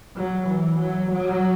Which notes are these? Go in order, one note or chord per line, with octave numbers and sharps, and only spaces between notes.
F#3
E3
F#3
F#3